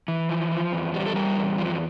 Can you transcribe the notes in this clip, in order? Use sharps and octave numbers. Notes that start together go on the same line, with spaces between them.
E3
F3
F3
E2
G3
A4
G3 A#4
E2
F3